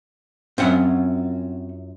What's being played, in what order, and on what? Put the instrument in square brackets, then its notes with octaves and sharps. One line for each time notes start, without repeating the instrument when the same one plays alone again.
[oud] F#2 E4 F4 [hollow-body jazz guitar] C4 C#4 F#5